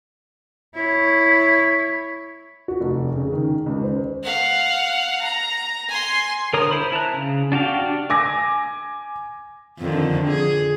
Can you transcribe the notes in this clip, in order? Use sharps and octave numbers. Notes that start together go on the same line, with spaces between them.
E4 C#5
F#4
F1
C#3
D#3
C#2
C5
F5 F#5
A#5
G#5 C6
D3 A#4 C#5 A#5 D#6
E4 C5 B5
E4 A5 A#5 F#6
C#3
D4 F#4 G4 F5
D4
G#5 D6 A#6
F2 D3 D#3
G#4